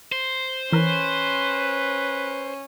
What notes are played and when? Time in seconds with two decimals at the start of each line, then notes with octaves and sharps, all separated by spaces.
0.12 C5
0.72 E3 C#4 A#4 B4